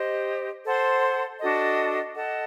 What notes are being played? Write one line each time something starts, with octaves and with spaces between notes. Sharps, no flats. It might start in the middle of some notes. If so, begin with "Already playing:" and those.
Already playing: G4 C5 D#5
A4 C5 F#5 C6
D4 F#4 A4 D#5
A4 D#5 F#5 A5